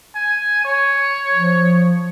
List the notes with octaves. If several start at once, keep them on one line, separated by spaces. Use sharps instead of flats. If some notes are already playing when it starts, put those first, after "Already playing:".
G#5
C#5
F3